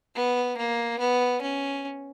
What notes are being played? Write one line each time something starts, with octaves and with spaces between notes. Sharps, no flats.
B3
A#3
B3
C#4